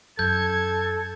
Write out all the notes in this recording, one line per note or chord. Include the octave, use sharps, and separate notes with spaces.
F#2 A4 G6 G#6